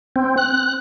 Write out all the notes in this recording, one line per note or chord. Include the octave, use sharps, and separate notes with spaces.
C4
F#6